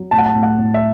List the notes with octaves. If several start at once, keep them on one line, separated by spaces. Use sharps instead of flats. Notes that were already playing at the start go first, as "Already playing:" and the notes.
Already playing: F#3
A2 A5
F#5
A5
A2
F#5
A2
E5